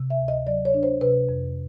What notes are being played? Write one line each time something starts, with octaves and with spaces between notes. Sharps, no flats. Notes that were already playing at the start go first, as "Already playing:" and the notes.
Already playing: C3
E5
D2
D#5
F#3 D5
C#5
D4
C5
C3 B4
F2